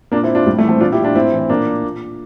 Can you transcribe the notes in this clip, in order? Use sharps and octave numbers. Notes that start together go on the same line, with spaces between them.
A#2 A#3 D4
C4 E4
D4 F4
A2 G3
A3
E3
A3 C4
A#2 D4 F4
E4 G4
D4 F4
A2 C4 E4
E3
C4
A#2 A#3 D4
A#2